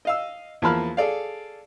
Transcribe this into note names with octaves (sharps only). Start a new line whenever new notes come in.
D#5 F5 E6
E2 F3 A#3 A5 B5 F6
G#4 A4 D5 F5